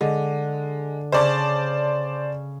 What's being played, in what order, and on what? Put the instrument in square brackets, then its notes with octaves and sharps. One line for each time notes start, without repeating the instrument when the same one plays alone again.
[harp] D3 [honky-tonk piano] G#3
[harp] C#3 [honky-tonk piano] C5 D5 A5